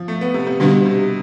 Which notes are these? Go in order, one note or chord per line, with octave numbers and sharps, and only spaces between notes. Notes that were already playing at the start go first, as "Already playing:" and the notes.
Already playing: F3
A3
B3
C3
C3
B2 D3 G3 D4 G4
C3